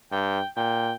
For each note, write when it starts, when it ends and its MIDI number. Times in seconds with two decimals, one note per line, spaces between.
0.12 0.40 43
0.12 0.48 79
0.57 0.92 46
0.57 0.93 79